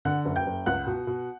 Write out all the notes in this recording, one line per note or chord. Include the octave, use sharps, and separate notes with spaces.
D3 F#5 F#6
F#1
G5 G6
F#1
C#2 F#5 F#6
B2
B2